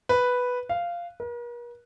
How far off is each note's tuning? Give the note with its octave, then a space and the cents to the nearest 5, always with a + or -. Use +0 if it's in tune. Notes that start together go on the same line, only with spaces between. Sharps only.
B4 +0
F5 -10
A#4 +45